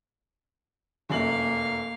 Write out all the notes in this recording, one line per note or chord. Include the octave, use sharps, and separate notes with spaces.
F1 F#2 A#3 F5 F#7